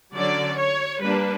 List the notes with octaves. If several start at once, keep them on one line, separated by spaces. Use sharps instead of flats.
D3 F#3 C#4 D5
C#5
G3 A#3 D4 B4